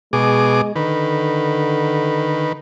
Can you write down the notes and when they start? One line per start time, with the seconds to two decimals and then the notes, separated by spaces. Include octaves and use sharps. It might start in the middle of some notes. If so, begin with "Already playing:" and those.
0.13 B2 G#3 G#4 D6
0.76 D3 D#3 B4